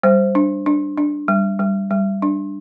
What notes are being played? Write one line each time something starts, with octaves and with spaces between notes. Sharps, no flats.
G3 C5
D4
D4
D4
G3
G3
G3
D4